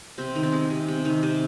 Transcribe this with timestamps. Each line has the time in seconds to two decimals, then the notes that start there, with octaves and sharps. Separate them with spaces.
0.18 C3 C4
0.35 D#3
0.43 C4
0.52 G#3
0.70 C3
0.88 C3
1.05 D#3
1.23 C3